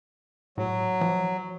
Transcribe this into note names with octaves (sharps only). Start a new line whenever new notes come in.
A2 F#3
F3